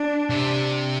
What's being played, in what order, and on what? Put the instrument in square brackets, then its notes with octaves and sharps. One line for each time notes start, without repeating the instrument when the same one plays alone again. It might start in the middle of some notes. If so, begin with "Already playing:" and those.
Already playing: [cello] D4
[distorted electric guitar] C3